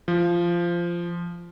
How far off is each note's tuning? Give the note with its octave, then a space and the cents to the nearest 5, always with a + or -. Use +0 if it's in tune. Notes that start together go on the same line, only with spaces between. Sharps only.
F3 -15